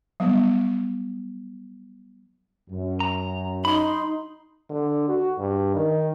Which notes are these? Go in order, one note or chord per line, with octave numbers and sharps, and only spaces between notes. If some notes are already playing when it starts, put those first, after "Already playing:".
F#3 G3 B3
F#2
A#5
D#4 B5 C6
D3
F#4
G2
D#3